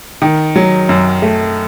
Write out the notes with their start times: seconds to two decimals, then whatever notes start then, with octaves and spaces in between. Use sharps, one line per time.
0.22 D#3
0.56 F#3
0.89 F#2
1.22 A3